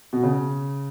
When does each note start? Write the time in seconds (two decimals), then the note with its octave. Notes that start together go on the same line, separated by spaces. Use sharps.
0.13 B2
0.23 C#3